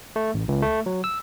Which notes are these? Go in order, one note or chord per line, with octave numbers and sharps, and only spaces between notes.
A3
A1
C#2
A3
F#3
E6